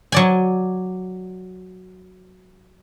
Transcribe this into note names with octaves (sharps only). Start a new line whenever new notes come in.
F#3 D5 G#5